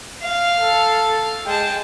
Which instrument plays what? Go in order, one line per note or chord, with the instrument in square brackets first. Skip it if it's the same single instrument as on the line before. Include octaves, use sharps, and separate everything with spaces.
[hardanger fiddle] F5
[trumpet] A4
[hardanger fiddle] G#3 A5 [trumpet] G5